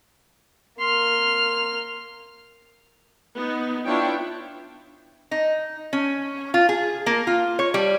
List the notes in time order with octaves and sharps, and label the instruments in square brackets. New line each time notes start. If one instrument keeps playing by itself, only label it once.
[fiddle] A#3 F6 [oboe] C6
[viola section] B3 D#4
B3 D4 E4 F4 C#5 G5
[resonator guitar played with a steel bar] D#4
C#4
F4
G#4
A#3
F4
C#5
G3